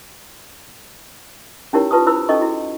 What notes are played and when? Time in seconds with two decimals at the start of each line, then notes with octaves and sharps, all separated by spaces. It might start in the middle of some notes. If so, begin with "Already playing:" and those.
1.73 C#4 D#4 E4 G4 A#4 C#5
1.91 F4 B4 A5 C#6 D#6
2.06 E4 C5 B5 E6
2.29 C#4 D#4 A4 D#5 C#6
2.41 E4 F#4